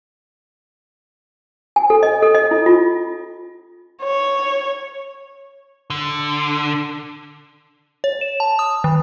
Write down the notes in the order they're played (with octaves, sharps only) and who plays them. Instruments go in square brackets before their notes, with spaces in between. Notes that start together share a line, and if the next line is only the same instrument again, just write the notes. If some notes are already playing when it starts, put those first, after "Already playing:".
[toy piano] G#5
A4
D#5
A4
D#5
E4
F4
[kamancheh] C#5
[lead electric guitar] D3
[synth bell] C#5
E7
A5
D#6
D#3